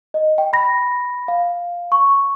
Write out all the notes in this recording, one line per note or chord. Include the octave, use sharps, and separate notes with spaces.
D#5
G5
B5 A#6
F5
C#6